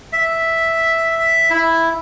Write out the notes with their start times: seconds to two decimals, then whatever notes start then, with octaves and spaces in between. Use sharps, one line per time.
0.13 E5
1.50 E4